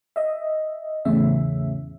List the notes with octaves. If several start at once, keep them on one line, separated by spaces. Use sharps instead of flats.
D#5 E5
E2 A2 C#3 C#4 E5